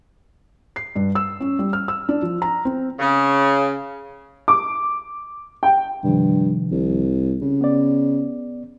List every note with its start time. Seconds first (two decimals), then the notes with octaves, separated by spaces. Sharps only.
0.76 C7
0.96 G2
1.15 E6
1.40 C#4
1.59 G3
1.73 F6
1.88 E6
2.09 D4
2.22 F3
2.42 A#5
2.65 C4
2.99 C#3
4.48 D6
5.63 G5
6.04 G2 C3 D#3 F3
6.72 C2
7.42 C#3
7.61 B3 D5